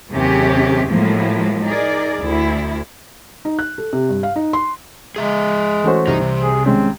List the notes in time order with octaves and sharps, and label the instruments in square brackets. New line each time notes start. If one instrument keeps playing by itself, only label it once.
[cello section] D#2 C3 F#3 C#4 G4 G#4
A2 F3 F#3 G#3 A#3
D#4 G#4 A#4 D5
D2 E4
[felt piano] D#4
F#6
A4
C3
G2
F5
D#4
C6
[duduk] G#3 [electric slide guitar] G#4 E5 A#5
[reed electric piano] E3 C5 [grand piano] A3 C#4 F#4
[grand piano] C2 [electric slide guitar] D#4
[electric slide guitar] C3
[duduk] G#4
[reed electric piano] D#3 G#3 C#4 [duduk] C4